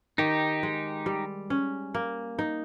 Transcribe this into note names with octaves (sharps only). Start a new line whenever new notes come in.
D#3 D#4 G4
G#3
G3
C#4
A#3
D#4